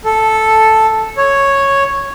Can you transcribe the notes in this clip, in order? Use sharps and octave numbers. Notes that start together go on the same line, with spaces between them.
A4
C#5